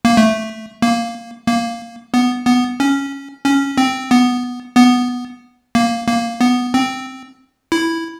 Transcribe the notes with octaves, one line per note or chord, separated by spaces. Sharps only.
A#3
A3
A#3
A#3
B3
B3
C#4
C#4
C4
B3
B3
A#3
A#3
B3
C4
E4